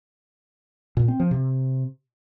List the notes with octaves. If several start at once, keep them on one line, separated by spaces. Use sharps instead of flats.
A#2
C4
F3
C3